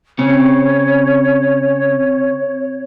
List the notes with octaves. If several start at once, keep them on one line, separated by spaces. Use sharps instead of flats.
C#3 C4 C#5